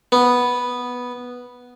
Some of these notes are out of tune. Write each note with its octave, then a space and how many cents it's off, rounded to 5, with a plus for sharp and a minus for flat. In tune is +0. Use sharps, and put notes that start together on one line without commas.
B3 -5